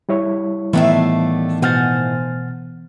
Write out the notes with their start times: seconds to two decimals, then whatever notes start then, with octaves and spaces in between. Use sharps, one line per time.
0.09 G3 E4 C#5
0.73 A2 D#3 E3 A3 B3 D4 E5 F5
1.62 B2 C5 F#5 G#5 F6 A6